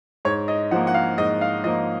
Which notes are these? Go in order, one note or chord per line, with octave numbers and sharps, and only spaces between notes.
G#2 C#5
D#5
F3 A#3 F#5
F#5
F5
G#2 D#5
F5
F3 A#3 D#5